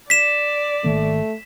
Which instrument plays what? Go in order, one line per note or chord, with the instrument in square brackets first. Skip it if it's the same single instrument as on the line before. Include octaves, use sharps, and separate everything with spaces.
[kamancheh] D5 [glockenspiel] B6 E7
[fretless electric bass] G#1 D#3 A#3 [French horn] A3